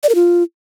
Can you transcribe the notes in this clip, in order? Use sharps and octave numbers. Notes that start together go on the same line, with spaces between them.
D5
A#4
F4